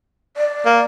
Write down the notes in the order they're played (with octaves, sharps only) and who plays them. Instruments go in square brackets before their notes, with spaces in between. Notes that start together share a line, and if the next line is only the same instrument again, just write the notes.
[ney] D5
[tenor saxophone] A#3